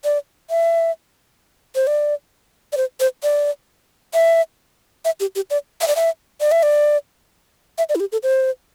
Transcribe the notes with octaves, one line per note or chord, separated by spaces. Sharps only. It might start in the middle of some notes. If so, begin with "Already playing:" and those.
D5
E5
C5
D5
D5
C5
C5
D5
E5
E5
G4
G4
D5
E5
D5
E5
D5
E5
D5
E5
D5
E4
G4
A4
C5